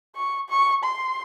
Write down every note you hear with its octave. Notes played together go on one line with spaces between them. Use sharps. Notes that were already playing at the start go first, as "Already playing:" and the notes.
C#6
C#6
C6